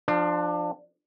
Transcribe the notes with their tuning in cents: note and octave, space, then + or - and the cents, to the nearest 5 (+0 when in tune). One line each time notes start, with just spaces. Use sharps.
F3 +0 D4 +20